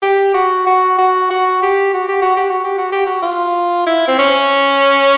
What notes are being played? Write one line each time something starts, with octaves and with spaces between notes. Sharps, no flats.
G4
F#4
F#4
F#4
F#4
G4
F#4
G4
F#4
G4
F#4
G4
F#4
G4
F#4
F4
E4
C4
C#4